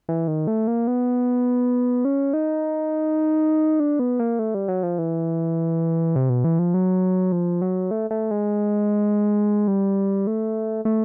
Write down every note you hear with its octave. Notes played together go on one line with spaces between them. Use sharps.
E3
D#3
A3
A#3
B3
C#4
D#4
D4
B3
A#3
A3
G3
F#3
F3
E3
C3
B2
E3
F3
F#3
F3
F#3
A3
A3
G#3
G3
A3
A3